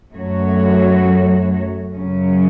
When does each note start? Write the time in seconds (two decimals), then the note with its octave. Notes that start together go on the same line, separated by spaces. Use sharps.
0.13 F#2 F#3 A3 F#4 C#5
1.92 F#2 C#3 F#3 C#4